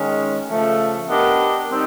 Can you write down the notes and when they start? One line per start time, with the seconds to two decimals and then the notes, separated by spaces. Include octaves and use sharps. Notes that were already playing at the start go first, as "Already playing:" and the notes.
Already playing: D#3 G#3 C#4
0.48 C#3 F3 A3
1.09 B3 D4 G4 A#4 D#5
1.69 G3 C4 D#4